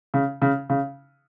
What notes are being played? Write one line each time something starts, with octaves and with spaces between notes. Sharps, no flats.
C#3
C#3
C#3